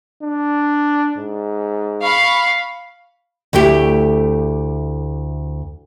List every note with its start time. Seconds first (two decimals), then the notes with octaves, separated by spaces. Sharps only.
0.23 D4
1.18 G#2
2.03 F5 B5 C#6
3.53 D2 A3 E4 G4